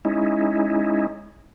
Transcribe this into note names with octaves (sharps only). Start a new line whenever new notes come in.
G#3 C#4 D#4 E4